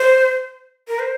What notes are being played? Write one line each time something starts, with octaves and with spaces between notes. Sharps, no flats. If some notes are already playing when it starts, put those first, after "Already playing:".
Already playing: C5
A#4
C5